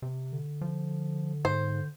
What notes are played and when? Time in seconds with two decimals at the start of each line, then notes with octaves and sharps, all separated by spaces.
0.02 C3
0.32 D3
0.61 F3
1.45 G#2 C5